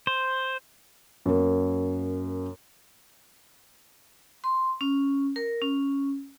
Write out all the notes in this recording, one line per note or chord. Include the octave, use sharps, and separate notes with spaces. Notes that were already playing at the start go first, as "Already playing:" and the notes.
C5
F#2 A#3
C6
C#4
A#4
C#4